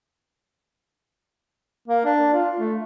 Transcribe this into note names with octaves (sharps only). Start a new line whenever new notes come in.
A#3
D4
F4
A3